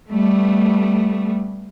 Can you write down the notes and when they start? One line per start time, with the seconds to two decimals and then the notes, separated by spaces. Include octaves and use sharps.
0.11 G3 A3 B3